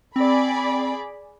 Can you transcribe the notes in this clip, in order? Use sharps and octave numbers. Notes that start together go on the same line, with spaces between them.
C4 G#4 D5 B5